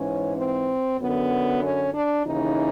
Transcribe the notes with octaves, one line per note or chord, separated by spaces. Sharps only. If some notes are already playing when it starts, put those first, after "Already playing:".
Already playing: G#2 E3 C#4
C4
F#2 D3 B3
C#4
D4
D#2 C#3 E3 D#4